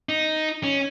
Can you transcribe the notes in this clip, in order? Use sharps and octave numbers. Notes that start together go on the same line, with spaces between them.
D#4
C#4